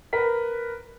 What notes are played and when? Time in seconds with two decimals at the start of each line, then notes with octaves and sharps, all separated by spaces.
0.13 A#4 B4 B6